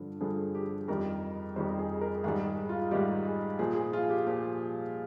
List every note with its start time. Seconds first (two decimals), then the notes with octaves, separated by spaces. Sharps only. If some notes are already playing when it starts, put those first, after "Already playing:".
Already playing: G2 D3 F3
0.21 G2 D3 F3 G#4
0.55 G4
0.88 F2 D#3 G3 A#4
1.56 F2 D#3 G3 C5
1.79 G#4
2.01 A#4
2.24 G#2 D#3 G3 G#4
2.46 G#4
2.69 F4
2.91 G#2 D#3 G3 G4
3.25 G#4
3.59 A#2 F3 G#4
3.76 G#4
3.93 F4
4.10 G4
4.27 A#2 F3 G4